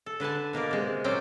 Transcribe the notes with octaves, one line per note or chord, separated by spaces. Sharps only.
A4
D3 B4 G#5 A5
B2 A#3 A#4 D5
C3 G#3
A#2 F#3 C4 C#4 D5 G5